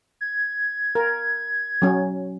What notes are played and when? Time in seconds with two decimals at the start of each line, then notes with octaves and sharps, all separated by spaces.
0.21 G#6
0.95 A#4
1.82 F#3 C#4